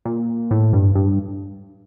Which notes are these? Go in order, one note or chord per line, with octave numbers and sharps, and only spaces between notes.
A#2
A2
G2
G2